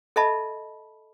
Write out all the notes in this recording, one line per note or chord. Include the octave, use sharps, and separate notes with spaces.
A4 D#5 E5 A5 B5